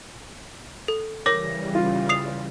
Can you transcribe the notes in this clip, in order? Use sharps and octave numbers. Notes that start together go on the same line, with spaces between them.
A4
C#3 E3 G3 A#4 C#5 D6 A#6
F4
D#6 C7 F7